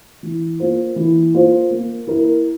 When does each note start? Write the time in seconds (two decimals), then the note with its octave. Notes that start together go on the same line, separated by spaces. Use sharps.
0.23 E3
0.60 A#3 F4 C5
0.96 E3
1.34 A#3 F4 C5
1.71 A#3
2.07 E4 A#4